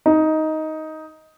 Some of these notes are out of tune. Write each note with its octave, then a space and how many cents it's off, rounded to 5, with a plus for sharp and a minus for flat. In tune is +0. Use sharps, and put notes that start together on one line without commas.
D#4 +10